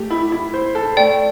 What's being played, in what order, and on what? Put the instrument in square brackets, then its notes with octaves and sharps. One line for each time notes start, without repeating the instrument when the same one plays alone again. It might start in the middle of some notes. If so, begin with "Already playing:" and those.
Already playing: [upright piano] A3 G4
E4
E4
C5
A4
[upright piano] A3 [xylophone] D5 G5